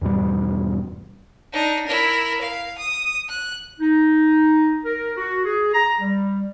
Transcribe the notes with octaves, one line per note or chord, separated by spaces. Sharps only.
E2 G#2 B2 G3
D4 D#4
E4 A#4
F5
D#6
F#6
D#4
A#4
F#4
G#4
A#5
G3